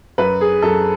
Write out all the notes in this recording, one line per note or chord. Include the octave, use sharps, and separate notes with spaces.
F#2 B4
G#4
F#2 A4